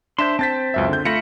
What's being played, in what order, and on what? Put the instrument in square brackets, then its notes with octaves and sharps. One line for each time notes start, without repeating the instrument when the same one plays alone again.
[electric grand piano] D4 E7 [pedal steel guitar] C5 E5 C6
[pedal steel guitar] C4 C5 [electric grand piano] A5 A6 B6
[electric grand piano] C#2 F#2 E5
D3 G6
[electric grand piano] A3 A#6 C#7 [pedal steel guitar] F4 E5 B5